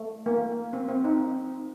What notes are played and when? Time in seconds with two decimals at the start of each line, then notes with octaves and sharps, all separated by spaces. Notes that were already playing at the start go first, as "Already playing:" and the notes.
Already playing: A3
0.26 A#3
0.73 C4
0.89 C4
1.04 C4 D#4